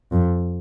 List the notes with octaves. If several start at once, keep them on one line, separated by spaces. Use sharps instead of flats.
F2